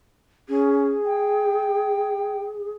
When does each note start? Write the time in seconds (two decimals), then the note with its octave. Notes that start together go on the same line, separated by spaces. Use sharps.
0.49 C#4 G#4
1.06 G5